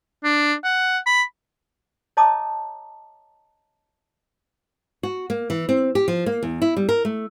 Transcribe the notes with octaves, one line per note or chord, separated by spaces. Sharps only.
D4
F#5
B5
C#5 D#5 A5 A#5 D6 D#6
F#4
A#3
E3
C4
G4
F3
A#3
E2
E4
G3
A#4
A3